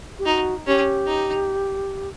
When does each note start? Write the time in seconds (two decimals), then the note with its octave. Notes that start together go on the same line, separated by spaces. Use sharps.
0.19 G4
0.26 D#4 F#4
0.67 C#4 G4
1.07 D#4